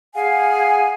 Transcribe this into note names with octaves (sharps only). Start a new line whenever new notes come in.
G#4 F5 F#5 G#5